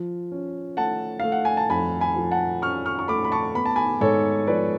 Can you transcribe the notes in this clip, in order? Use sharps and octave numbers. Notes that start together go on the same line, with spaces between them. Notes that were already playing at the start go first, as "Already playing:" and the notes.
Already playing: F3
C#4
A3 F#5 A5
A3 F5
F#5
G#5
A5
F2 G#5 B5
G#5 B5
F3
F#5 A5
C#4 C#6 F6
C#6 F6
C#6
A3 B5 D6
B5
A5 C#6
B3 B5
A5
G#5 B5
G#2 A4 C#5
F3 B4 D5